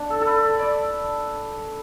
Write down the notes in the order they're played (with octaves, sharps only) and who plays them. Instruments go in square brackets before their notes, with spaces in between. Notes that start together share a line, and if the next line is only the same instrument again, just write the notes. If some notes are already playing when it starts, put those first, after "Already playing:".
Already playing: [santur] D4
A4
A4
B4
D5